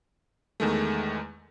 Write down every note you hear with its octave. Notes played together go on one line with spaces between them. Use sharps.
E2 D#3 G#3 A3